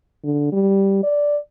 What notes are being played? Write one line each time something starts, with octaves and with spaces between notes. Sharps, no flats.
D3
G3
D5